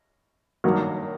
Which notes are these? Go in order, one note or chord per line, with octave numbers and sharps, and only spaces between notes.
G2 D#3 F#3 A#3